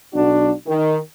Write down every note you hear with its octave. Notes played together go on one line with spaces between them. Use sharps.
B1 D4 F#4
D#3